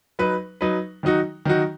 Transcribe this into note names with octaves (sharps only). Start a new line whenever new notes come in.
F#3 D#4 B4
F#3 D#4 B4
D#3 F#3 D#4 F#4
D#3 F#3 D#4 F#4